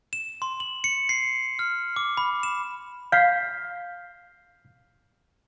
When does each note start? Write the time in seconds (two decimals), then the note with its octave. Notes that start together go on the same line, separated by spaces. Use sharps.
0.13 E7
0.42 C6
0.60 F#7
0.84 C#7
1.09 C7
1.59 F6
1.96 D6
2.17 B5
2.43 E7
3.12 F5 F6 G6 B6 C7